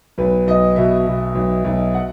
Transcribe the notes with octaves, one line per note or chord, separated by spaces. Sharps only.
B1 B4
B1 D#5
B2 E5
B2
B1
B1
F#5